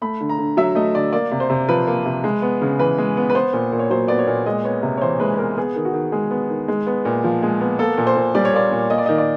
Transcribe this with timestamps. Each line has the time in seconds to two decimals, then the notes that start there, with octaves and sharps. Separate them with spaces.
0.02 A3 B5
0.21 D3
0.29 A#5
0.39 D3
0.57 F#3 E5
0.75 A3 D#5
0.94 D3 D5
1.13 A#3 D5
1.32 C3
1.40 C5
1.50 C3
1.69 F3 B4
1.87 A#3
2.06 C3
2.24 G#3
2.42 B3
2.61 C#3
2.79 E3 B4
2.98 G#3
3.17 B3
3.30 B4
3.35 B3 C5
3.53 A#2
3.72 A#2
3.79 C#5
3.90 F#3 C5
4.08 B3 D5
4.19 C#5
4.27 A#2
4.46 G#3 D#5
4.64 B3 C#5
4.83 C3
4.97 C#5
5.01 E3 C5
5.20 G#3 B4
5.34 B4
5.39 B3 A#4
5.57 B3 G#4
5.76 D#3
5.85 F#4
5.94 D#3
6.12 G#3 G#4
6.31 B3
6.49 D#3
6.68 G#3
6.87 B3
7.05 A#2
7.24 F3
7.42 G#3
7.61 B3
7.79 A#3 A4
7.98 A#2
8.07 C5
8.16 A#2
8.35 G3 D5
8.45 C#5
8.53 A#3 D5
8.72 A#2
8.90 A#3 D#5
8.98 D5
9.06 D#3 D#5
9.18 D5